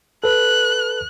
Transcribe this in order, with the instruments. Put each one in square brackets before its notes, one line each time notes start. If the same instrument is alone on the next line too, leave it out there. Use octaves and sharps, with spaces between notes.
[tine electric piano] A4 B4 [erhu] F#6